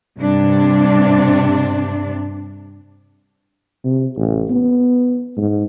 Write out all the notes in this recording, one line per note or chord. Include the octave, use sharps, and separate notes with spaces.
G2 C3 D4
C3
A1
B3
G#2